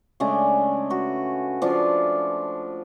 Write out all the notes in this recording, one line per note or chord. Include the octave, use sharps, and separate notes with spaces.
C#3 G#3 A3 D4
F#4 B4
F3 D4 F4